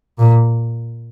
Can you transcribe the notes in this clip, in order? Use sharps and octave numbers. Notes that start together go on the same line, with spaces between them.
A#2